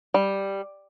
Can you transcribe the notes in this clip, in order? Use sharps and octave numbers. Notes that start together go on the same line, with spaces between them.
G3